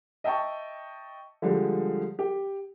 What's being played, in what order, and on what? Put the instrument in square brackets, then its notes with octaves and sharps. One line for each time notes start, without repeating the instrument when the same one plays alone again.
[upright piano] D#5 E5 G5 A5 C#6
D3 F3 G3 G#3
G4